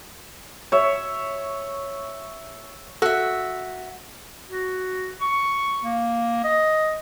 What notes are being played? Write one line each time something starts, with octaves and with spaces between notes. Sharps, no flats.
C#5 E5
F#4 A4 E5
F#4
C#6
A#3
D#5